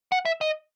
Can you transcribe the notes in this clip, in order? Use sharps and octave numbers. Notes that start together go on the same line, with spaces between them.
F#5
E5
D#5